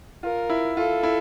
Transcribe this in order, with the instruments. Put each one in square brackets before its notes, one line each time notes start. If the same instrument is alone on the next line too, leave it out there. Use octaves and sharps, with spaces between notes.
[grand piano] F4 [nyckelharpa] A#4
[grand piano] E4
[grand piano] F4 [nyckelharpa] A4
[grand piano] E4